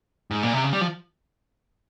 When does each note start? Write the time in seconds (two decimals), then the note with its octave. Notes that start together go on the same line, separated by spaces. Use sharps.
0.31 G#2
0.43 A#2
0.53 C3
0.64 C#3
0.73 G3
0.81 F3